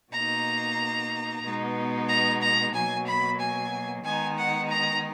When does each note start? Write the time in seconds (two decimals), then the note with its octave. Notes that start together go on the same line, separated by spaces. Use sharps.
0.11 B2 A#3 D#4 A#5
1.43 B2 G#3 B3 D#4
2.08 A#5
2.41 A#5
2.73 B2 F#3 A#3 G#5
3.06 B5
3.39 G#5
4.04 D#3 G#3 B3 D#4 G#5
4.37 F#5
4.69 A#5